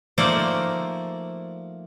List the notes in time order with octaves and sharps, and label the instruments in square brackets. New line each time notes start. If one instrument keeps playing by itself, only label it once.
[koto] F3 A3 A#3 D#4 C5 D5